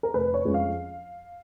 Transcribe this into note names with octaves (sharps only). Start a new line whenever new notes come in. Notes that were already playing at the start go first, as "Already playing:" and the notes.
A#4
F1 B4
C#5
F2 F3 G#3 C#4
F5